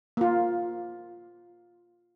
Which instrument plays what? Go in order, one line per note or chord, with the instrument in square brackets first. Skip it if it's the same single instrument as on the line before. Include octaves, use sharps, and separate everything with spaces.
[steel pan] A#3 F4